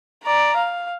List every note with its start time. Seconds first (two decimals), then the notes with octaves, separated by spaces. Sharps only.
0.24 D5 A#5
0.56 F5